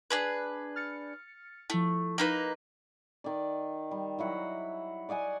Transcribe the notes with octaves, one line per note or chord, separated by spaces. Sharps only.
D4 G#4 B4
F6 A6 C#7
F3 A3 E4
A#3 D#4 B4
D#3 D5
G3
F#3 E4 F#5
D5 D#5 F#5 G#5